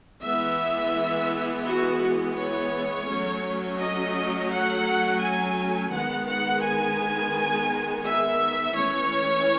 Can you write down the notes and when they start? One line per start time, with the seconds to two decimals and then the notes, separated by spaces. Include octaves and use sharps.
0.22 E3 G#3 B3 E5
1.65 F#4
2.35 C#5
3.07 F#3 A3 C#4
3.78 D#5
4.49 F#5
5.20 G#5
5.91 D#3 G#3 B3 F#5
6.27 F#5
6.62 G#5
8.03 E5
8.74 E3 A3 C#4 C#5